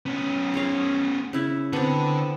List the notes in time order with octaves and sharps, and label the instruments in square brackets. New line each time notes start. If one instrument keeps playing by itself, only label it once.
[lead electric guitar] B3 C#4
[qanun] G#4 C#5 F5
C#3 E4 E5
[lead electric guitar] D3 A4 [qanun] B3 C4